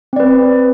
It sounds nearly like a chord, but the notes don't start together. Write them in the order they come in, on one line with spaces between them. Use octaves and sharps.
C4 D5 B4